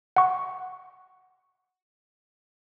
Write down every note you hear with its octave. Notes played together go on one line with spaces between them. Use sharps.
F#5 C#6